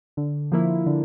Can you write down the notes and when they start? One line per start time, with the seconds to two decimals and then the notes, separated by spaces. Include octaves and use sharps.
0.17 D3
0.52 F3 A#3 E4
0.86 D3